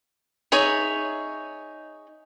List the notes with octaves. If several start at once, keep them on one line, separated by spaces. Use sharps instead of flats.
D#4 G#4 C#5 E5